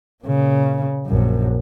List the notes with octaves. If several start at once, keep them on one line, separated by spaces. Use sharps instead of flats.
A#2 C#3
A#1 F#2